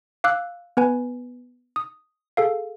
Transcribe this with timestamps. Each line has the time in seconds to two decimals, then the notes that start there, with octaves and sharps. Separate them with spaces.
0.24 F5 D6 E6 F#6
0.77 B3 B4 G#5
1.76 D#6
2.37 G#4 A4 F5